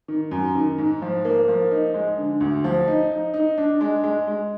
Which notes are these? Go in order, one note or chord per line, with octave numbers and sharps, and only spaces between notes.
D#3
F#2
D#3
G#2
F3
A#3
F3
D#4
G#3
D3
D2
F3
D#4
D#4
D#4
D4
G#3
G#3
G#3